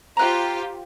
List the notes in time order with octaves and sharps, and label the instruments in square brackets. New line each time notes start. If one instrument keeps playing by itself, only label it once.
[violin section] F4 G4 C5 [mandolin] A#5 F#6